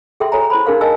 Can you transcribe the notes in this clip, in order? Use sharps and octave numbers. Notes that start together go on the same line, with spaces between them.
G#4 A4 E5 G5 C6
F#4 A4 C#5 G#5 A#5
E4 C5 B5
D4 D#4 G#4 A#4 F5 C6
A#4 D#5 G#5 A5 E6